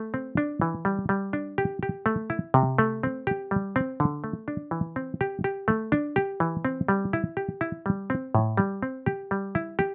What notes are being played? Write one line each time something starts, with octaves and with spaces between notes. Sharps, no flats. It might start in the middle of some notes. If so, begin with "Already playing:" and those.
Already playing: A3
C4
D4
E3
G3
G3
D4
G4
G4
A3
E4
C3
A3
C4
G4
G3
C4
D3
A3
D4
E3
C4
G4
G4
A3
D4
G4
E3
C4
G3
E4
G4
E4
G3
C4
A2
G3
C4
G4
G3
E4
G4